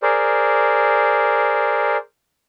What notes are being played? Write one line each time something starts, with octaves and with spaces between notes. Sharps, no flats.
G#4 A#4 C5 D5